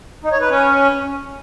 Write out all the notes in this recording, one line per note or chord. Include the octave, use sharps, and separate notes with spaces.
D#4
C#5
B4
C#4